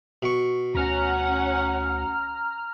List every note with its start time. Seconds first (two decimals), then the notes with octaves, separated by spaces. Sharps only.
0.23 B2 C#6
0.75 D2 C#4 F#5 A#5 F6